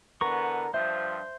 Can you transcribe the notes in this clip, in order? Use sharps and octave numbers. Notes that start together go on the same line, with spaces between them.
D3 E3 B3 A#4 C#6
G2 F3 C5 E5